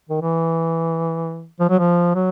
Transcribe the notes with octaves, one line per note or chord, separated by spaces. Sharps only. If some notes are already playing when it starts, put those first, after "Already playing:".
D#3
E3
F3
F#3
F3
F#3